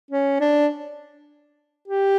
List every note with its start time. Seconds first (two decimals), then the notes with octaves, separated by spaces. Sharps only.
0.11 C#4
0.40 D4
1.88 G4